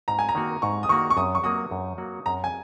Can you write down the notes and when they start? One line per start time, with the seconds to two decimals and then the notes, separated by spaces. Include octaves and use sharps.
0.08 G#2 A#5
0.19 G#5
0.29 A#5
0.35 D#3 A#3 F#4
0.62 G#2 C#6
0.83 D#6
0.89 D#3 A#3 F#4 C#6
1.10 C#6
1.17 F#2 D#6
1.35 C#6
1.44 F#3 A#3 F#4 D#6
1.71 F#2
1.98 F#3 A#3 F#4
2.26 F#2 A#5
2.44 G#5